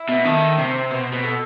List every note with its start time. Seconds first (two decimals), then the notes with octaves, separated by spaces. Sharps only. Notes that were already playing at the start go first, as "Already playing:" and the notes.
Already playing: E4
0.09 B2
0.25 D#3 A4
0.58 C3 C5
0.91 B2 C5
1.13 B2
1.23 A4